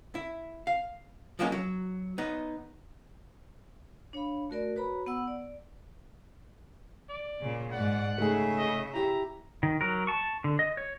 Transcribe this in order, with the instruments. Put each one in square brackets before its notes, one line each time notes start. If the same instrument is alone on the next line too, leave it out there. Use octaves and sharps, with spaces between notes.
[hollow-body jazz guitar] E4
F5
F3 F#3 G#3 A#3 B3 C#4
F#3
B3 D#4
[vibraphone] D4 C#5 F5 B5
A3 F#4 A#4 D5
F#4 B4 C#5 A#5 B5
B3 F#5 E6
D5
[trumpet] D5
[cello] A#2 C#3
[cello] G#2 D5 [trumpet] F#5
[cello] C#3 E5 [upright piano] A3 D#4 G#4
[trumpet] D#5
[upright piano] E4 G4 [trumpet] A#5
[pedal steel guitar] D#3
F#3 A#4
A5 C#6
D3
D#5
C#5